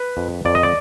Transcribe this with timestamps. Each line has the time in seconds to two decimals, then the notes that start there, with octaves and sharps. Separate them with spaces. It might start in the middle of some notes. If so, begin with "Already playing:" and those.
Already playing: B4
0.17 F2
0.45 F2 D5
0.55 D#5
0.63 D5